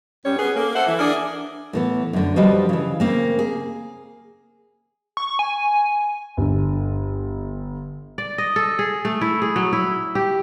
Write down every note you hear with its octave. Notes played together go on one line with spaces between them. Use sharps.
F#2 G3 C#4 C#5
B3 C#4 G#4 B4
A#3 A4
A4 C5 E5 F#5
E3
D4 G#4 A#4 D5
A2 E3 B3
F#2 D3
F3 G3 F#4 B4 D#5
C#3 E3
C#3 A#3 C4
G#4
C#6
G#5
G1 D3
D5
D#5
A4
G#4
A3
E4
G#4
F#3
E4
G4